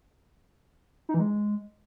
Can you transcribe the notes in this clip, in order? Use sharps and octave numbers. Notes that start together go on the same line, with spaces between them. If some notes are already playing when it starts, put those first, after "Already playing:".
D#4
E3
G#3